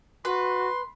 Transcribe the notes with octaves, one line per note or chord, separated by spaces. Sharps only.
F#4 B4 C6